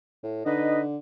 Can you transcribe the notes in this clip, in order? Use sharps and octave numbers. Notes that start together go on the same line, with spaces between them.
A2
D3 D#4 B4 D#5